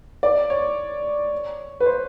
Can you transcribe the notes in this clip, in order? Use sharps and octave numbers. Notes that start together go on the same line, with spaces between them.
D5
C#5
B4
C5